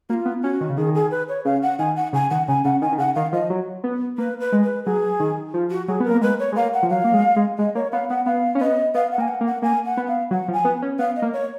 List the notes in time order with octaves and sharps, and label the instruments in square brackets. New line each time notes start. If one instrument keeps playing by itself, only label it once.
[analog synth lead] A#3 [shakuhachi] F#4
[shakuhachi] F4
[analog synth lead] B3
[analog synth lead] C#4 [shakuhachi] F#4
[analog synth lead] D#3
C#3
[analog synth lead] D#3 [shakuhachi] G#4
[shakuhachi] G#4
B4
C#5
[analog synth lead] C#3 [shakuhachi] F5
[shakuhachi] F#5
[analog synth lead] D#3 [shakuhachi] G#5
[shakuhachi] F#5
[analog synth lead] C#3 [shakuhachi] G#5
[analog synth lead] D#3 [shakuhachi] F#5
[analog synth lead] C#3 [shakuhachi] G#5
[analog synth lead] C#3 [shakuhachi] F#5
[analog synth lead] D#3 [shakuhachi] G#5
[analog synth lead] D#3
[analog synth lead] C#3 [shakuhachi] F#5
[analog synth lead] D#3 [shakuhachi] F5
[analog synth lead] F3 [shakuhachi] D#5
[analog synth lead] F#3
B3
[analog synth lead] A#3 [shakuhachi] B4
[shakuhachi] B4
[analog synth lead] G#3
[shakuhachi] B4
[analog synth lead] F#3 [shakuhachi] G#4
[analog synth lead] D#3
F3
[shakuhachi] F#4
[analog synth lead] F#3 [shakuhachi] G#4
[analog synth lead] B3 [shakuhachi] A#4
[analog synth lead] A#3
[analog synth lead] G#3 [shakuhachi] B4
[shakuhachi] C#5
[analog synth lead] G#3
[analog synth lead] A#3 [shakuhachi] F5
[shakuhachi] F#5
[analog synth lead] F3
[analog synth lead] F#3 [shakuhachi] F5
[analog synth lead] A#3
G#3
G#3
[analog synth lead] G#3 [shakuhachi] D#5
[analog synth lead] A#3 [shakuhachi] C#5
[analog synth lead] B3 [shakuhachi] F5
[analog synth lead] B3 [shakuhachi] F#5
[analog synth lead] B3 [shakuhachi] F5
[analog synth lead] C#4
[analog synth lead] B3 [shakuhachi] D#5
[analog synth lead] B3 [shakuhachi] F5
[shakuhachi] F#5
[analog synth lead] A#3
[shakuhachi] G#5
F#5
[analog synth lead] A#3
[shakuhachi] F#5
[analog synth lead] A#3 [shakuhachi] G#5
[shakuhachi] F#5
[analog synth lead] B3
[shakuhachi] F5
[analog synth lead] F#3 [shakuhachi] F#5
[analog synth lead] F3
[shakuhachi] G#5
[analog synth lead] B3
C#4
[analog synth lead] B3 [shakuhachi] F5
[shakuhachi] D#5
[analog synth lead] A#3
[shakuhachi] C#5